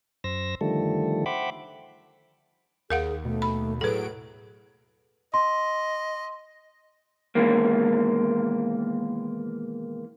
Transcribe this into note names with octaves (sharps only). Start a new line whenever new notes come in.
F#2 C5 E6 A#6
D3 D#3 F3 G3 A3 A4
C5 E5 F#5 G5 B5 D6
D#2 G#4 A#4 F5 F#5
B2 A3
B5
A2 F#3 G#4 A4 B4 D7
D#5 C6
B2 D#3 E3 G#3 A#3